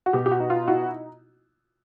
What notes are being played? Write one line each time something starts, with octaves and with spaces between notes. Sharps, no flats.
F#4
B2 G4
G4
F#4
D#4
F4
E4 F#4